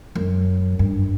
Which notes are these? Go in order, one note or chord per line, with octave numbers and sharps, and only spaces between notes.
F#2
G2